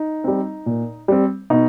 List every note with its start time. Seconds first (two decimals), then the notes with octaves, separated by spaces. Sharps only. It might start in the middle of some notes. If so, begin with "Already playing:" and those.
Already playing: D#4
0.24 G3 C4
0.66 A#2
1.08 G3 C4
1.50 B2 D#4